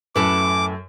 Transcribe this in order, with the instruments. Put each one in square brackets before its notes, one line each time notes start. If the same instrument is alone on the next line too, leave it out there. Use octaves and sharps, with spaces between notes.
[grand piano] F#2 [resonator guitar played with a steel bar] A2 A4 B4 [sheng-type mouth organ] D6